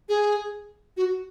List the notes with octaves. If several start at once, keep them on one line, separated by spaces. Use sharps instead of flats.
G#4
F#4